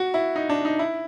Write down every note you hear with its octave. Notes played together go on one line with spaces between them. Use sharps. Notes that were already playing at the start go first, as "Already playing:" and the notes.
Already playing: F#4
E4
D#4
D4
D#4
E4